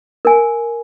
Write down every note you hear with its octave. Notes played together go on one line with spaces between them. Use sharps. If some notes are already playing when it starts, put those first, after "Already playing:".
A#4 G#5